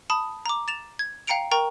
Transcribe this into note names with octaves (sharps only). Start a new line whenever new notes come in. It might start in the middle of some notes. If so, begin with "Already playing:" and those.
A5 B5 D#6
A#5 D6
A6 E7 F7
G#6
F5 G5 A#5 C#7 D7 F7
A#4 G5 A#5 C#6